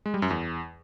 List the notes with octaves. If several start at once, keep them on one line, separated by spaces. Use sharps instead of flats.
G#3
G3
F#2
E2